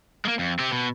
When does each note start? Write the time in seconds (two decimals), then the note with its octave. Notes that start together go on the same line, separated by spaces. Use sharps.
0.25 G#3 A#3
0.39 F2
0.59 C4 G4
0.72 B2